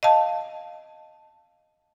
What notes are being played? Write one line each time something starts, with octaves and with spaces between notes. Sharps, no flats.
D#5 F5 A5